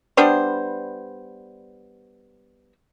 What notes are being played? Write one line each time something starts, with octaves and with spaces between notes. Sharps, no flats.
G3 B3 D4 C5